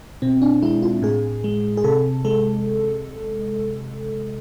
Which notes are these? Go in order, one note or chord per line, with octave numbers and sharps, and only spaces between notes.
B2 C4
D4
G#3 E4
F4
A2 G#4
G#3
G#4
C3 A4
G#3 A4